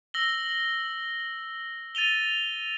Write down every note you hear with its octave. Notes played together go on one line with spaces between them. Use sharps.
E6 A#6 F#7 G7
A6 D#7 F7 G7